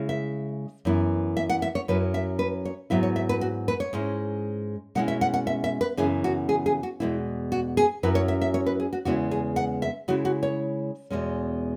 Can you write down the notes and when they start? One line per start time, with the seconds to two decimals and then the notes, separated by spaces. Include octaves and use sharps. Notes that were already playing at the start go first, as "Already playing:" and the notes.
Already playing: C#3 G#3 E4
0.09 E5
0.85 F#2 E3 B3 E4
1.37 E5
1.49 F#5
1.62 E5
1.75 C#5
1.88 F#2 F#3 C#4 E4 B4
2.14 E5
2.39 B4
2.65 C#5
2.90 G#2 F#3 B3 E4 E5
3.03 C#5
3.16 E5
3.29 B4
3.41 F#4
3.68 B4
3.80 C#5
3.93 G#2 G#3 C#4 E4
4.95 B2 G#3 C#4 E4 F#5
5.08 E5
5.21 F#5
5.34 F#5
5.47 E5
5.64 E5
5.81 B4
5.97 F#2 C#3 E3 B3 E4 G#4
6.24 F#4
6.49 G#4
6.66 G#4
6.83 F#4
7.00 E2 B2 G#3 E4
7.52 F#4
7.77 G#4
8.03 F#2 F#3 C#4 E4 B4
8.15 C#5
8.28 E5
8.41 E5
8.54 C#5
8.66 B4
8.80 G#4
8.93 F#4
9.05 E2 C#3 G#3 B3 E4 F#4
9.31 G#4
9.56 F#5
9.82 E5
10.08 C#3 G#3 E4 F#4
10.25 F#4
10.43 C#5
11.10 E2 B2 G#3 C#4